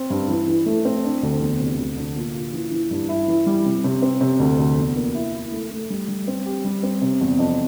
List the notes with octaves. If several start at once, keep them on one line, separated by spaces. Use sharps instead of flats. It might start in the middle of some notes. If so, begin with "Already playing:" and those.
Already playing: C4
G2
E3
E3
A3
C4
D4
D2
E2
C3
D2
D3
A#2
F4
E3
E3
G2
E4
E3
G3
C3
C3
C4
C3
D2
D2
E2
A#3
E4
E4
A3
A3
G3
G3
C4
G4
G3
C4
C3
E2
F2